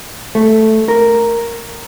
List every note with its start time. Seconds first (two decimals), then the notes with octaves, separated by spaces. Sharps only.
0.35 A3
0.88 A#4